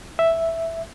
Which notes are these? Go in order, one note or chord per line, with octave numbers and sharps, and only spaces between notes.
E5